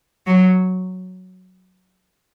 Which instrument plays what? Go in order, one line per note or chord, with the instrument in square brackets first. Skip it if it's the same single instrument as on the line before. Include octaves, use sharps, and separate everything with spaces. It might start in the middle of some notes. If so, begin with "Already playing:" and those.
[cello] F#3